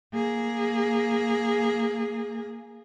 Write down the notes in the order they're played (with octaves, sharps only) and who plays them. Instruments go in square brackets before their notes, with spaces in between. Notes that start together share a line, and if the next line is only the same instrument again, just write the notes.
[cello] A#3 G#4